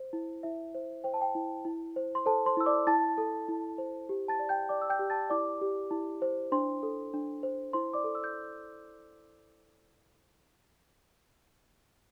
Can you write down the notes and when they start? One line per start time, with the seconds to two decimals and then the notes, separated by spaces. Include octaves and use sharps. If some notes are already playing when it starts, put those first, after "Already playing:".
Already playing: C5
0.13 E4
0.43 E4 E5
0.75 C5
1.04 C5 G5
1.14 A5
1.21 G5
1.35 E4
1.65 E4
1.96 C5
2.15 C6
2.26 A4 C5 A5
2.46 C5 C6
2.57 E4 E6
2.66 D5 D6
2.87 E4 A5 A6
3.18 A4
3.48 E4
3.78 C5
4.09 G4
4.28 A5 A6
4.39 D5
4.49 G5 G6
4.69 D5 D6
4.82 E6
4.89 G5 G6
4.99 G4
5.10 A5 A6
5.30 E4 D5 D6
5.61 G4
5.91 E4
6.22 C5
6.52 D4 C5 C6
6.83 A4
7.14 D4
7.43 C5
7.73 E4 C5 C6
7.94 D5 D6
8.04 A4
8.15 E6
8.24 G6